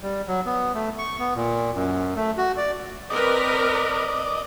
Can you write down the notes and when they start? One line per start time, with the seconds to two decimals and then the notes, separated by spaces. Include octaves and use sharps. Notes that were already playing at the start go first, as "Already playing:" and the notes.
0.02 G3
0.28 F#3
0.46 B3
0.75 A3
0.99 C#6
1.19 B3
1.35 A#2
1.75 F#2
2.16 A3
2.37 F#4
2.57 D5
3.10 C4 A#4 B4 D5 D#5